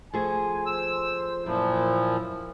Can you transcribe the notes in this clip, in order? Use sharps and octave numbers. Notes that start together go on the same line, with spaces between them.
F3 A3 G#4 G#5
C5 E6
F#2 A#2 F3 E4